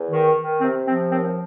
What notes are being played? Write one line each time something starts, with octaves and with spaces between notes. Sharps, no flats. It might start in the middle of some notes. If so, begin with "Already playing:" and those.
Already playing: E2
D#3
D#3
C3 C4
F3 C4
D#2 C4